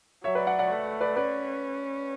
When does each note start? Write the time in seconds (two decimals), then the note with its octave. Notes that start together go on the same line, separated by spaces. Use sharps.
0.24 F#3 C#5 E5
0.35 B4 D5
0.47 D5 F#5
0.59 D5 F#5
0.70 A3
1.01 B4 D5
1.16 C#4 B4 D5